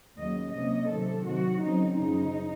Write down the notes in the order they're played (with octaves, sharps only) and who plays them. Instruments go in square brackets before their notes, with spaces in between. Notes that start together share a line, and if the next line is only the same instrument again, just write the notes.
[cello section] D#2 C#3 F#3 D#5
C3 F#3 A#3 C#4 D#5
C3 D#3 F#3 A4
C3 D#3 F#3 F#4
C#3 F#3 C4 D#4
F#2 C#3 F3 D#4